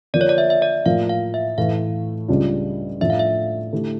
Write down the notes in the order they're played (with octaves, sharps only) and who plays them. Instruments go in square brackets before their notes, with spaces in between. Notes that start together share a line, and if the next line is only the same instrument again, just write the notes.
[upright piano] D3 F3 A#3 D4 F4 [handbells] D5
[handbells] C#5
D5
E5
E5
D5
[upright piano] A2 F3 A#3 [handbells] F5
[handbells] F5
E5
[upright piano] A2 E3 A3 [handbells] F5
[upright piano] C#2 C#3 G3 D4 F4
[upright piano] A2 F3 A3 D4 [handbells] E5
[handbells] F5
E5
[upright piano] D3 A3 E4 G4